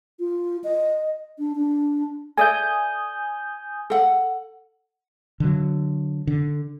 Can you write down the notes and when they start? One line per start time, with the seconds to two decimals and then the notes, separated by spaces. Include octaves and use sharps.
0.20 F4
0.64 D#5
1.39 D4
1.55 D4
2.37 A4 D5 E5 G#5 D#6 G6
3.90 A4 F#5
5.40 D3 F#3
6.27 D3